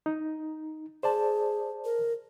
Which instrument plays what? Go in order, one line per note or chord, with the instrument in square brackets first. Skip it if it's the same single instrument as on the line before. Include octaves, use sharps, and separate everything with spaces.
[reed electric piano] D#4
[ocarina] G#4 [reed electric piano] C5 D5 A5
[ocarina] A#4